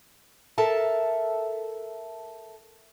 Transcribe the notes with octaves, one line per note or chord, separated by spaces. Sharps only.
A4 A#4 E5 A5